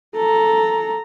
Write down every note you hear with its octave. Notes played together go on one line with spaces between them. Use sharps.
A4 A#5